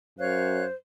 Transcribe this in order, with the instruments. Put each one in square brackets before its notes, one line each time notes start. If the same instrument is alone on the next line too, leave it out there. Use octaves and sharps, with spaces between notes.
[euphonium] F#2 [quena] C5 [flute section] C#5 F5 F#6